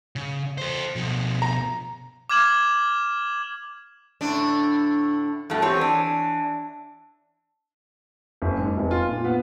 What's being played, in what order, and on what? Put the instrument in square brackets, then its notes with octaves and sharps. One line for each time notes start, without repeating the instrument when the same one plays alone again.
[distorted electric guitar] C#3
A4 C5
B2 F3
[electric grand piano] A#5
[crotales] D6 F6 G#6 E7 F#7
[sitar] A2 D3 D4
[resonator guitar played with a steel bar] G2 B2 A3
[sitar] E3 [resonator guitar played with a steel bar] C4 G4 C#5
[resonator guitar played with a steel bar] D4
[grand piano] F#1
G#2
F1
F4
A#2
B3